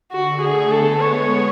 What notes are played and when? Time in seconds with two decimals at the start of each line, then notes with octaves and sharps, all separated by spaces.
0.11 D3 F#4
0.41 A3 G#4
0.71 B3 A4
1.00 G#3 C#5